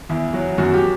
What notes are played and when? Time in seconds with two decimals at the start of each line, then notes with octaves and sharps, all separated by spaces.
0.09 E2 E4
0.33 F#3 F#4
0.58 F#2 F#4
0.74 G4